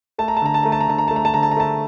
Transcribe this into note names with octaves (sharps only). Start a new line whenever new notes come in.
A3 A5
A#5
A5
D3 A#5
A5
A3 A#5
A5
A#5
D3 A5
A#5
A3 A5
A#5
A5
D3 A#5
A5
A#5
A3 A5